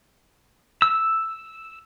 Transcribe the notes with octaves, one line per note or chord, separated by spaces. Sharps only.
E6